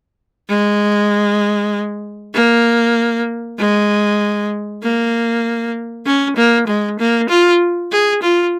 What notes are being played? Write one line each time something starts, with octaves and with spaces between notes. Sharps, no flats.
G#3
A#3
G#3
A#3
C#4
A#3
G#3
A#3
F4
G#4
F4